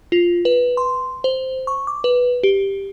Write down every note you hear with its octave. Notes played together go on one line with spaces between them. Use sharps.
F4
B4
C6
C5
C#6
D6
B4
G4